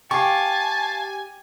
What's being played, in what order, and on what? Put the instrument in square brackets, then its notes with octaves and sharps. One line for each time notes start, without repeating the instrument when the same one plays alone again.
[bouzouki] G4 [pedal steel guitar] F5 C#6 [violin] G#5 [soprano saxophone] A5